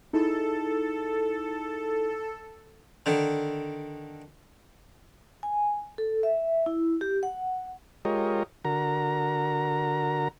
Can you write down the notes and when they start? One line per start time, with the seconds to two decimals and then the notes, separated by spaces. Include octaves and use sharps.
0.13 D#4 E4 G#4 A4
3.06 D3 D#3
5.43 G#5
5.98 A4
6.23 E5
6.66 E4
7.01 G4
7.23 F#5
8.05 G#3 F4 G4 A#4 C#5 D#5
8.65 D3 F#4 A#4 A#5